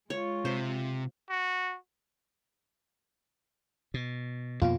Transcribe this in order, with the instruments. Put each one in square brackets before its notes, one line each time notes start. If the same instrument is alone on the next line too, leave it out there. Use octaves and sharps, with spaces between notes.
[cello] G#3 F4 [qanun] C#5
[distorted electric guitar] C3 [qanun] C5
[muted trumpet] F#4
[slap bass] B2
[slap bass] F2 B2 A#3 [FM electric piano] F4